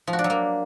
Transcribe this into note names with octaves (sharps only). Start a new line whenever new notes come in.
F3
F#4
D4
F#3
A#3